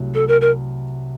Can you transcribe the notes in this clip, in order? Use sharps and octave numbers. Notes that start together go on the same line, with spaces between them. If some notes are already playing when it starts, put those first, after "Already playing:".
Already playing: C2 F#3 A3
A4
A#4
A#4